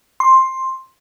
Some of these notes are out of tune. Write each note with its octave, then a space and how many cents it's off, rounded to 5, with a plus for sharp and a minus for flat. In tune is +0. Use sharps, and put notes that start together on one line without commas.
C6 +10